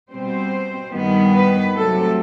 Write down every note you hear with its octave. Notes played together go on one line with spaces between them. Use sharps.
B2 G3 C4 C5
G2 D#3 G3 B3
B4
C3 F#3 A3 A4